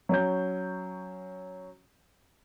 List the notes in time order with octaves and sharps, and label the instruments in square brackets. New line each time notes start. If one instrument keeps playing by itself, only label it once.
[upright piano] F#3 C#4 G6